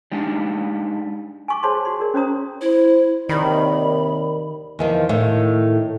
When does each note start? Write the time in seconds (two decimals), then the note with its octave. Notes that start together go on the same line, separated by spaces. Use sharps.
0.12 G3 G#3 D4 D#4
1.48 G#5 C#6 D6
1.63 G#4 C5 C#5 A5 C6 C#6
1.85 F#4 D5 C6
2.00 G#4 A#4 D5
2.14 C#4 C5 C#5 A#5 D#6
2.61 E4 C5
3.29 D#2 C3 D#3 D5 B5
4.79 E2 D#3 F3
5.09 A2 D#3